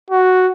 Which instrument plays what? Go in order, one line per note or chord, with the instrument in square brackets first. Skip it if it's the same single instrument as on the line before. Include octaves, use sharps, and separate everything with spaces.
[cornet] F#4